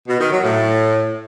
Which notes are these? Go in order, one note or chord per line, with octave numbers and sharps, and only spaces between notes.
B2
D#3
F#3
A2